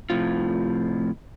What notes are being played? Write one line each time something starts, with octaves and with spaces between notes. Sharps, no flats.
A2 C3 F3 F4